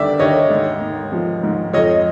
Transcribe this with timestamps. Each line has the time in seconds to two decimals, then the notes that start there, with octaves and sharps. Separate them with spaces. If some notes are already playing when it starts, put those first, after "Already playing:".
Already playing: D#2 D3 G3 D5 E5
0.19 D#2 C#5 D#5
0.50 G#2
0.82 G#2
1.12 F3
1.43 G#2
1.73 F2 C#5 D#5